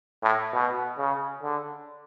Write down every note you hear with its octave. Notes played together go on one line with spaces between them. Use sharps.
A2
B2
C#3
D3